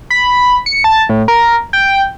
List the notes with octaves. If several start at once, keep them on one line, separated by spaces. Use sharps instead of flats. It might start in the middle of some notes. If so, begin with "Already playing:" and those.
B5
C#7
A5
A2
A#4
G5